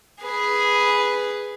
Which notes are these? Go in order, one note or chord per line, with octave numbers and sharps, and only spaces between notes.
G#4 B4